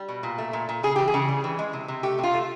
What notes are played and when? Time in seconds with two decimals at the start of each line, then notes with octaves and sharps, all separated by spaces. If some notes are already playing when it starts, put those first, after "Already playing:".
Already playing: G3
0.08 B2
0.23 A#2
0.38 A3
0.53 A#2
0.69 A#2
0.83 C#3 G#4
0.96 E3 G4
1.08 G#4
1.14 C#3
1.28 G3
1.44 E3
1.59 G#3
1.73 C3
1.88 C3
2.03 A3 G4
2.18 C3
2.23 F4
2.34 A3